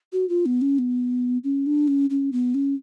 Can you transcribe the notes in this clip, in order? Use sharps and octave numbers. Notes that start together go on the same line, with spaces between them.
F#4
F4
B3
C#4
B3
C#4
D4
C#4
C#4
B3
C#4